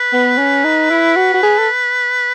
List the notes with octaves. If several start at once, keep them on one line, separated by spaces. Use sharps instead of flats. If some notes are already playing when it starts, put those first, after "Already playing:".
Already playing: B4
B3
C#4
D#4
E4
F#4
F#4
G#4
A4